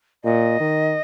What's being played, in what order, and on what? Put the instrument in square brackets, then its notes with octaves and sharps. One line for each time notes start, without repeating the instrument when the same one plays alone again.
[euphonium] A#2 [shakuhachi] D#5
[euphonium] D#3